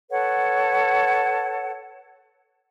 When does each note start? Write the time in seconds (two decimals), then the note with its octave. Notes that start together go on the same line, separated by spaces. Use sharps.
0.10 A4 B4 C#5 F#5